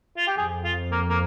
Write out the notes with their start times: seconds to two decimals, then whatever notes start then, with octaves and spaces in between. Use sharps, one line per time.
0.17 F4
0.27 G4
0.37 F2 G#4
0.64 F4
0.91 A#3
1.10 A#3